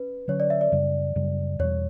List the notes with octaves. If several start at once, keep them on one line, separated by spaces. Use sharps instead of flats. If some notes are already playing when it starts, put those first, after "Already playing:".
Already playing: C#4 B4
D3 F#3 C#4 C#5
D5
E5
D5
F#2 C#3 G3
F#2 C#3 G3
E2 B2 G3 C#5